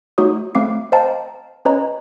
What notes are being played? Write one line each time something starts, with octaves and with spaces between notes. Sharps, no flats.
A3 D#4 F#4 C#5 D#6
A3 C4 F5 D6 C7
C5 D#5 F5 G5 A5 A#5
C#4 B4 C#5 D#5 A#5